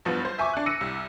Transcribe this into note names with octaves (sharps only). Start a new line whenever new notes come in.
F#1 G2 F3 B3
C5
E5 G#5 C#6 D6
D4 F#6
E6 A#6 C#7 D#7
C2